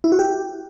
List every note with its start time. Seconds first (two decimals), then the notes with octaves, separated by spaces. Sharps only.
0.04 E4
0.12 F#4
0.19 G4